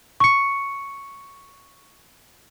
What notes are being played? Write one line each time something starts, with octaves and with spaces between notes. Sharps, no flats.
C#6 C#7